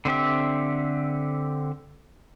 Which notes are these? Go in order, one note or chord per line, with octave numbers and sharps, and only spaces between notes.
D3 C4 G4 E5